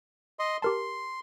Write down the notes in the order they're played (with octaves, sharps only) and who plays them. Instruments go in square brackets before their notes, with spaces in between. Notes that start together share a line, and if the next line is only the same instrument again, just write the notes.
[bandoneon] D#5 C6
[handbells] G4 A#4 A5 [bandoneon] C6